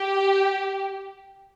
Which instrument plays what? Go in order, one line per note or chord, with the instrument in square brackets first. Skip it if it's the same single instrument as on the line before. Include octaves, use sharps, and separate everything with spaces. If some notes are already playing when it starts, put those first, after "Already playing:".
Already playing: [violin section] G4